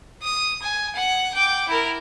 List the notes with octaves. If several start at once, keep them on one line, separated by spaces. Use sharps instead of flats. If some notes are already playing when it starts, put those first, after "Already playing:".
D#6
G#5
F#5
G5 D6
E4 A#4